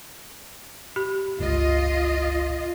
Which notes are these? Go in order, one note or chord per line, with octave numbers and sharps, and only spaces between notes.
G4 B5
G1 C#2 F4 D#5